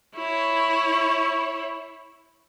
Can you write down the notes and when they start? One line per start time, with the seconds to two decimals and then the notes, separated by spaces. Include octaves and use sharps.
0.16 E4 C#5